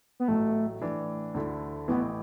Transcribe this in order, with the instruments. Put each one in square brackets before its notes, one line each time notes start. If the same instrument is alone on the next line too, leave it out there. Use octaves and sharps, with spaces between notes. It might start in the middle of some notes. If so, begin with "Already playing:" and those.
[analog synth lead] B3
[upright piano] A1 A2 F#3 [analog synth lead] A3
[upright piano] A2 E3 D4
D2 D3 A3 E4
[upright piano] A1 A2 E3 [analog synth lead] B3